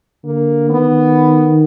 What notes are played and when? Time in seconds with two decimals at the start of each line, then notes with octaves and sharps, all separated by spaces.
0.24 D3 A#3
0.69 D#3 B3